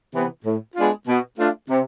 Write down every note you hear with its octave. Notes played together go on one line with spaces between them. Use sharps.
C3 E3 B3
A2
G#3 B3 D4 F4
B2
A3 D4 F4
C3